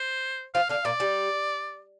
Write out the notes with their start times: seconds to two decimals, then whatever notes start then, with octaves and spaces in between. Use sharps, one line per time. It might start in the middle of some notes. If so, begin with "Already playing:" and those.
Already playing: C5
0.54 F3 F4 F5
0.69 D3 D4 F5
0.85 A#2 A#3 D5
1.00 G3